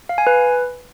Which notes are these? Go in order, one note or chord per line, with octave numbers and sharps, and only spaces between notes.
F5
G#5
B4